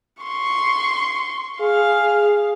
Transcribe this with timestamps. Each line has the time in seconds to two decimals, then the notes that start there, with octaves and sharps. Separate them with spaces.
0.23 C6 C#6
1.61 G#4 F5